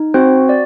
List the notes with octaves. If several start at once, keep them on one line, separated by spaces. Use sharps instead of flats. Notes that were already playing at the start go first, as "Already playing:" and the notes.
Already playing: D#4
C4 F#4 C5
D5